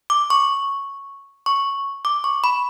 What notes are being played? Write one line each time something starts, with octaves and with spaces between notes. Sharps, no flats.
D6
C#6
C#6
D6
C#6
B5